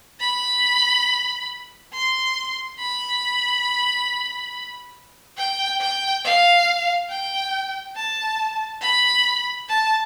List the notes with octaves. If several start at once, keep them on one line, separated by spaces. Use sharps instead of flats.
B5
C6
B5
G5
G5
F5
G5
A5
B5
A5